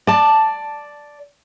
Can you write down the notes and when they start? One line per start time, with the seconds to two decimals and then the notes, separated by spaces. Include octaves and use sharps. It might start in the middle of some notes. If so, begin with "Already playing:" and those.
0.07 D5 A5